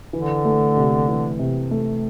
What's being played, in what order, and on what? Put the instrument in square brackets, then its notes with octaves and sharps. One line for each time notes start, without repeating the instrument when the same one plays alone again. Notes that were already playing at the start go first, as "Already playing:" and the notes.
[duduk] D3 [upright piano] E3
[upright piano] A3
C3
E3
C3
A3